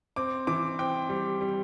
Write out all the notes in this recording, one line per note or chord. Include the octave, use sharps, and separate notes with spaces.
C4 D6
E3 D6
C4 G5
G3
G3